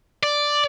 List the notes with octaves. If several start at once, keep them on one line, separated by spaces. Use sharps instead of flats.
D5